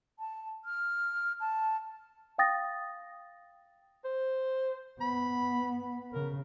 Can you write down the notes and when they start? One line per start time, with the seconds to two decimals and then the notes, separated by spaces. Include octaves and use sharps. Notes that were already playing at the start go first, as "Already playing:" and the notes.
0.19 A5
0.65 F6
1.40 A5
2.38 F5 G5 D#6 A6 A#6
4.05 C5
5.01 B3 B5
6.13 C#3 A#4